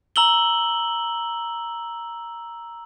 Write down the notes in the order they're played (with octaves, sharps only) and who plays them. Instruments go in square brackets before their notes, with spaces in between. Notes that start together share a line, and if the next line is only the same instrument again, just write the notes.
[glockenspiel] A#5 E6 F#7 G7